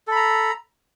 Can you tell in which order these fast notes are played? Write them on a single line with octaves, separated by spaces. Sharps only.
A4 B5 A#5